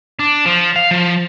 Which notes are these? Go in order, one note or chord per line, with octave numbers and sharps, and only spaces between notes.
D4
F3
F5
F3